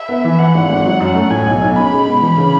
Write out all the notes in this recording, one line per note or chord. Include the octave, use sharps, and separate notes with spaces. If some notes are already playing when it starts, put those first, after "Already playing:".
Already playing: E5
B3
E3
E3 F#5
G#1
G#1
F#3
F#2
A3
A2 G#5
B1
B1
C#4 B5
G#3
B2
E3 B5
C#3